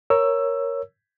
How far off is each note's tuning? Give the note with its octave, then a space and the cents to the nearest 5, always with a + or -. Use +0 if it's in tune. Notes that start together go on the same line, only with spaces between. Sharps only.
A#4 +0 C#5 +0 E6 +10